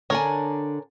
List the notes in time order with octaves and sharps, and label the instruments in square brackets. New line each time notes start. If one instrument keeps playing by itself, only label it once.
[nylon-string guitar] D3 D4 G#5 [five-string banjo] A#4 C#5